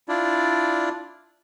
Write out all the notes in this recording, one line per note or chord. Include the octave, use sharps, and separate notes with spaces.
D4 E4 F4 D5